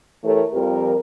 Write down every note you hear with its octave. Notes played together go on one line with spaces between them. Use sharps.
E3 A3 G4 A4 A#4 C#5
F2 F3 G3 G4 A#4